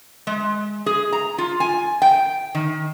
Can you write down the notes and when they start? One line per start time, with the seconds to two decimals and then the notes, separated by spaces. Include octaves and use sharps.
0.27 G#3
0.86 G#4
1.13 A#5
1.38 F4
1.60 G#5
2.02 G5
2.55 D#3